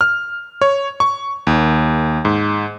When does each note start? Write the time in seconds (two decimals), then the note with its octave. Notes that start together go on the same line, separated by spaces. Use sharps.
0.01 F6
0.62 C#5
1.00 C#6
1.47 D#2
2.25 G#2